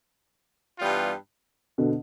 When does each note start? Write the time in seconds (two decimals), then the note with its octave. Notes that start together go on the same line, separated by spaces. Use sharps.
0.79 G2 E3 G3 B3 F4
1.78 B2 D3